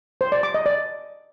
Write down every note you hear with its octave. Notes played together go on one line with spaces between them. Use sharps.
C5
D5
D6
D#5
D5